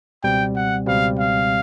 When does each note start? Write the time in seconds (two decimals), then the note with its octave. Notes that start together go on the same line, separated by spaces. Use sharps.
0.23 C#2 B2 G3 C4 G5
0.55 F#5
0.86 C#2 B2 G3 C4 F5
1.18 F5